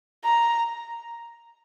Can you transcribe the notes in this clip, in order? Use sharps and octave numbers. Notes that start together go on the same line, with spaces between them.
A#5